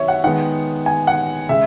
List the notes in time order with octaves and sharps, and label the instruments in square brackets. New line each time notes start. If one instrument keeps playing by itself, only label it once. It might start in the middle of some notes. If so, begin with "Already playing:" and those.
Already playing: [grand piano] D#3 F#3 B3 [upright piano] C#5 E5
[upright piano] F#5
[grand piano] D#3 G#3 B3 [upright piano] F#5
[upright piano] G#5
F#5
[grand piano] C#3 G#3 [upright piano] E5